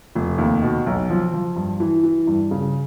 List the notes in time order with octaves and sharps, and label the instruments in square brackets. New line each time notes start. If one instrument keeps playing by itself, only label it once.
[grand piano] F1
D#2
B2
B1
F3
F3
G2
E3
E3
G2
C#3